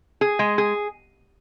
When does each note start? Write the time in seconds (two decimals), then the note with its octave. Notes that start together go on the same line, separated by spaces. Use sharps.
0.21 G#4
0.39 G#3
0.58 G#4